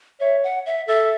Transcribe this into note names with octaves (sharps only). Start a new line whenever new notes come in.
C#5 E5
F#5
E5
A4 E5